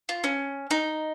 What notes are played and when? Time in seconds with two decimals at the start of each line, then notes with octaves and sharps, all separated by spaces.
0.09 F4
0.24 C#4
0.71 D#4